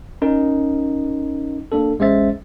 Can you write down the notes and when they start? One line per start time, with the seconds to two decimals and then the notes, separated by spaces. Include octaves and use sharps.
0.22 C#4 D#4 A#4
1.72 A#3 D4 A4
1.99 A1 G#3 C#4 C5 E5 A6